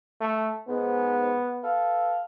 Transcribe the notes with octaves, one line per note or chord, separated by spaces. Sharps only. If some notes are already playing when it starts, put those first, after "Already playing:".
A3
G#2 B3
A4 B4 F5